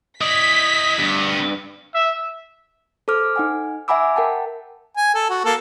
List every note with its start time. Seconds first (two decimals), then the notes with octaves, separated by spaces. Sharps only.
0.21 E4 D5 D#5 B6
0.99 D2 G2 B3
1.95 E5
3.08 A4 C5 D6 F6
3.36 D#4 F#5 G#5
3.88 E5 F#5 G#5 B5 D6 E6
4.16 A#4 F#5 G5 A5
4.97 G#5
5.15 A4
5.30 F#4
5.45 A#3 A4